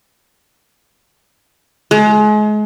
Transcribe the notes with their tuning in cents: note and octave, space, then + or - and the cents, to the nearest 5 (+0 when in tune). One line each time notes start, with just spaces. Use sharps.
G#3 +35